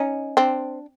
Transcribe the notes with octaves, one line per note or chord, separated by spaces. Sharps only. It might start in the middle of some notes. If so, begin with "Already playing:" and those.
Already playing: C#4 D#4
C4 D4